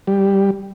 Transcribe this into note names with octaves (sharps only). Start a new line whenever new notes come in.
G3